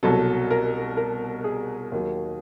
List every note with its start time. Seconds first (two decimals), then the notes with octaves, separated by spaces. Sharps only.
0.03 C2 B2 F#3 A4
0.51 A#4
0.97 A#4
1.44 G#4
1.92 D#2 D#3 F#3